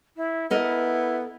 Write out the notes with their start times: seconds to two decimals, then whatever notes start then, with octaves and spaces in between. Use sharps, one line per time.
0.17 E4
0.51 B3 E4 A4 A#4 D#5